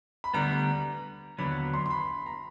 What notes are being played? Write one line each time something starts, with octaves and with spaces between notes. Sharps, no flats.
B5
D2 D3 G3 B3 A#5
D#2 D3 F#3 B3 B5
C6
C6
B5
A#5